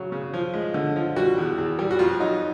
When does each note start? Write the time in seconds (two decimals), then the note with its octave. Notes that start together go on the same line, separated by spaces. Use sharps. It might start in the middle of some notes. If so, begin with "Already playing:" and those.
Already playing: C#3 F#3
0.12 C#3
0.34 F3
0.54 G#3
0.74 D3
0.96 F3
1.16 G3 F#4
1.38 E2
1.58 E2
1.79 G3
1.91 F#4
1.99 F2 F4
2.20 F#3 D#4